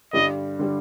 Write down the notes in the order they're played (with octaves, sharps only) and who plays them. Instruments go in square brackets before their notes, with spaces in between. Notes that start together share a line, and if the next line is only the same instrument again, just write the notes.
[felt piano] G2 D3 G3 [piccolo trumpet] D#5
[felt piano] D3 G3